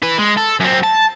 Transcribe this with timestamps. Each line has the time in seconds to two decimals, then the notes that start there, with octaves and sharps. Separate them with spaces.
0.03 E4 B4
0.19 G#3
0.38 A4
0.60 F#2 C4
0.84 A5